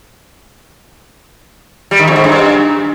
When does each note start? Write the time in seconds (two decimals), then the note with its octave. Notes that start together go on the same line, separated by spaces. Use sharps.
1.91 G3
1.99 D#3
2.08 F2
2.16 G#2
2.24 G2